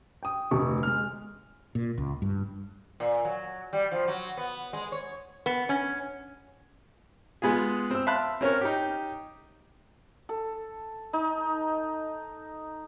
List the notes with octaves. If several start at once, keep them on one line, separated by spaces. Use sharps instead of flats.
G5 D#6
F1 D2 C#6
G#3 F6
A#2
C#2
G2
A#2
F#3
G3
F3
F#3
B3
G#3
C#5
B3
C#4
G#3 B3 F4 G#4
C4 E6
E5 F5 A5 B5 C6 F#6
C4 C#4 A#4 C#5
D#4 G4
A4
D#4